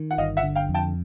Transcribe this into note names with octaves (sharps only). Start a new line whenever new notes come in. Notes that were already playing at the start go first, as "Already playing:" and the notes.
Already playing: D#3
F#5
G1 D#5 F5
E5 F#5
D3
F5 G5
F2
G5 A5